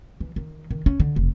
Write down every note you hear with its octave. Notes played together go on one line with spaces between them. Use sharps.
E3
D#3
D#3
C#4
D3
F1